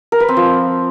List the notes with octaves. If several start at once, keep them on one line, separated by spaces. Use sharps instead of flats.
A#4
B4
C4
F3